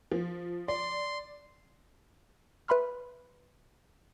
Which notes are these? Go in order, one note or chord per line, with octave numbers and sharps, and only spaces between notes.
F3
D5 C6
B4 E5 B5 C6 F6